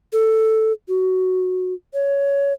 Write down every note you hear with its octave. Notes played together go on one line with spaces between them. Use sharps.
A4
F#4
C#5